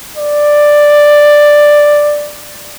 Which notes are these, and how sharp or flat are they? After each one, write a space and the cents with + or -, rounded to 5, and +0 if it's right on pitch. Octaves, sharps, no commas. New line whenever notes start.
D5 +5